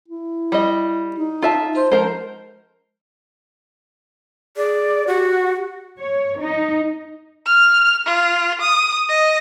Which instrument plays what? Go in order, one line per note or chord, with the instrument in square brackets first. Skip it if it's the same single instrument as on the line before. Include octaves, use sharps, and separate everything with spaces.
[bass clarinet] E4
[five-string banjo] G3 D#5
[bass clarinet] D#4
[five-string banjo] F4 E5 A5
[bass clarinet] C5
[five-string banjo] F3 A#4 C5 [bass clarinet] G#3
[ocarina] G#4 [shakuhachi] D5
[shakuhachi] F#4 [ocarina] G4
[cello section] C#5
D#4
[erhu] F6
F4
D#6
D#5